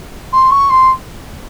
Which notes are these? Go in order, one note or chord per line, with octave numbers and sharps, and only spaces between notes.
C6
C#6
C6